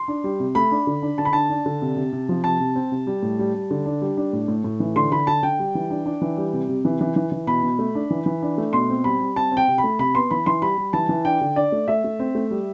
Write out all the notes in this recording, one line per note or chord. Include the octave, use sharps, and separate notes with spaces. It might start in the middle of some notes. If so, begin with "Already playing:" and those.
Already playing: C6
D4
G3
C3
A3 B5
D4
D3
D4
D3 A5
B5
D4 A5
D4
D3
C3
C3
C3
F3
C3 A5
C3
C4
C3
G3
A2
G3
G3
D3
D4
G3
D4
A2
A2
A2
E3
D3 C6
D3 B5
D3 A5
D3 G5
G3
E3
D4
D4
E3
G3
C3
C3
E3
E3
E3
E3
B2 B5
B2
A3
D4
E3
E3
D4
A3
B2 C6
C4
G3 B5
G3
C4 A5
C4
G5
C3
B5
A3
C3 B5
B3 C6
E3 B5
E3 C6
G3 B5
G3
E3 A5
E3
D4 G5
D3
D4 D5
A3
A3 E5
A3
C4
A3
G3